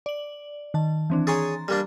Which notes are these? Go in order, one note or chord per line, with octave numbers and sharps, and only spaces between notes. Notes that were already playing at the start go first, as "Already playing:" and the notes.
D5 F#7
D#3 A5
E3 C4 D4
G#4 C#5 G#5 A#5 C6 A6
G3 A#3 D4